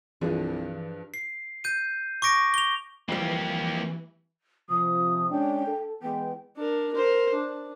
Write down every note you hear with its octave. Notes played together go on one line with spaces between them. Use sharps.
C2 G2 E3 F3 D4 G#4
C7
G6 D#7
C#6 D6 A#6 D7
F7 G7
F2 E3 G3 A#3 G4
C3 F3 D#6
G#3 C#4 D4 G5
A4
E3 G#3 B3 G5
D4 A#4
A#4 C5
D4